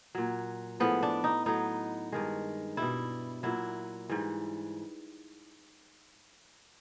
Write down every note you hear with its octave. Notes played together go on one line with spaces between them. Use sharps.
A#2 F#3
A2 F3 G#3 B3
D4
D#4
A2 F#3 D#4
G2 D#3 G#3
B2 G3 E4
A#2 F#3 E4
G#2 E3 G3